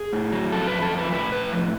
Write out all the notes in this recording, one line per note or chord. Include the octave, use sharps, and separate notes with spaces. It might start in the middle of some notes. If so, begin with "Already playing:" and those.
Already playing: G#4
A2
F#3
F2 A4
B4
F2
A4
F3
B4
A2 B4
A2 B4
F3